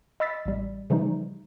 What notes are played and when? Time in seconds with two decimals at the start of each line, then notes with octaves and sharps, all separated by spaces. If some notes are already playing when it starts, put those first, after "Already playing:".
0.20 D#5 B5 E6 A6 B6
0.45 A1 G3
0.90 C#3 E3 F3 G3 A3 D#4